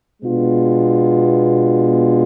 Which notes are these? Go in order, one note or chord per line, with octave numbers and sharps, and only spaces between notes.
B2 G#3 B3 D4 F4